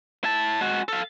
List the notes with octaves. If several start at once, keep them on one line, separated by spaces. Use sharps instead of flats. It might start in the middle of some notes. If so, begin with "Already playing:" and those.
E4 A5
G#3 F#4
A4 F5